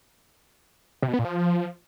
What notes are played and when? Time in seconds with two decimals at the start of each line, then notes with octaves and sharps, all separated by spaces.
1.02 C3
1.08 B2
1.13 B3
1.19 A#2
1.24 F3